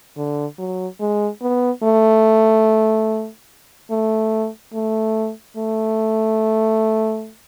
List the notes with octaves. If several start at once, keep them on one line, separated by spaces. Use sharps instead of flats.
D3
F#3
G#3
B3
A3
A3
A3
A3